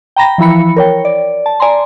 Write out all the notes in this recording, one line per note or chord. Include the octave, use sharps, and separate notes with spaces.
G5 A#5 B5 A#6
E3 F3 E4 B5 C#7
A#4 C#5 G5
D5
A5
D5 G#5 A#5 C6